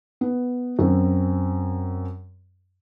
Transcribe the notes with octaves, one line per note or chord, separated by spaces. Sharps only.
B3
F#2 C4